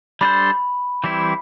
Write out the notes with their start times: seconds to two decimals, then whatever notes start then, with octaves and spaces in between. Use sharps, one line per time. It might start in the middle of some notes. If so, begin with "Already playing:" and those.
0.21 G3 D4 A4 C5 B5
1.04 E3 G3 C4 E4